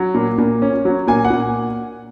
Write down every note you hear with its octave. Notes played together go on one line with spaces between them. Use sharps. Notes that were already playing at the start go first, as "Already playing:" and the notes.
Already playing: F#3
A#2
A#2
C#4
F#3
A#2 G#5
F#5
A#2